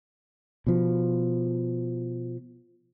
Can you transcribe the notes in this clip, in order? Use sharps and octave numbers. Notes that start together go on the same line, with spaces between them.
B2 F3